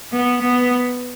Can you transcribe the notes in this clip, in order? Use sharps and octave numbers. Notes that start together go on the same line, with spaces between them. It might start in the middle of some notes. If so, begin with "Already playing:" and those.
B3
B3